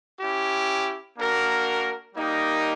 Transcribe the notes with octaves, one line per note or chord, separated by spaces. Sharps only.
C#4 E4 G4
A#3 D4 F#4 A#4
G3 A#3 D#4 G4 A#4